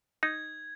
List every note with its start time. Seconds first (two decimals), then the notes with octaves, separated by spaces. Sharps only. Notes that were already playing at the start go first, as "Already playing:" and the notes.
0.23 D#4 G#6